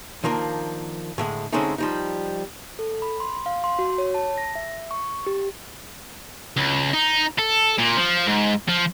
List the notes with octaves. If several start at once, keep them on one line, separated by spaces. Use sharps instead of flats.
D#3 F3 A#3 D4
A2 D3 G#3
D3 G#3 A3 C4 C#4 D#4
F3 G3 D#4
A4
B5
C6
F5
C6
F#4
C#5
A5
A#6
E5
C#6
G4
C#2
D#4
A4
A#2
F3
G#2
F3